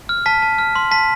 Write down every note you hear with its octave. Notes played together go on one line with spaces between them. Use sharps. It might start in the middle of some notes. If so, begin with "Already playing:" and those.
F6
A5 B6
A5
F6
C6
A5 B6